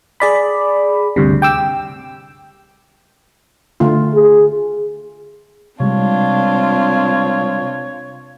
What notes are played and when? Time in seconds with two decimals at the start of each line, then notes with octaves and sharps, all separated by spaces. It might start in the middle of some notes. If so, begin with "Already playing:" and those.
0.20 G#4 D5 B5
1.16 D2 G2 C3
1.42 G5 D6 E6
3.80 D3 A3 F4
4.14 G#4
5.80 C3 G3 G#3 C4 D4 F4 C#5